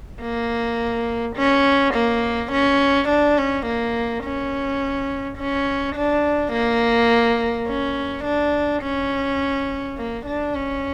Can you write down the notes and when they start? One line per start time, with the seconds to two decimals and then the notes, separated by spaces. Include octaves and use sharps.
0.22 A#3
1.37 C#4
1.94 A#3
2.52 C#4
3.09 D4
3.38 C#4
3.66 A#3
4.24 C#4
5.38 C#4
5.96 D4
6.52 A#3
7.68 C#4
8.25 D4
8.83 C#4
9.98 A#3
10.26 D4
10.54 C#4